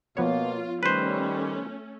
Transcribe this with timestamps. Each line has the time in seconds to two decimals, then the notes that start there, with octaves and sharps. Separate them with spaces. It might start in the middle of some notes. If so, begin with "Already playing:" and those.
0.17 B2 F3 A#3 B3 F4 C#5
0.83 D#3 G3 A3 C#4 B4 C5